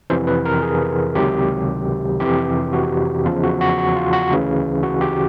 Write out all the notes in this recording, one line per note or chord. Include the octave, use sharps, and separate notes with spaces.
F2 C3 E3 C5
B4
A#4
G#4
C#2 C3 D#3 F#3 G4
F2 C3 E3 G4
F#4
E2 C#3 F3 F4
F#4
F#4
F#4
F4
F#4
D2 C#3 E3
F#4
G4